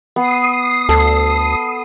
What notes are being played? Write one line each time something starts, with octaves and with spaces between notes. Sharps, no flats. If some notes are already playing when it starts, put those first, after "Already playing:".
B3 D#6 C7
D2 A4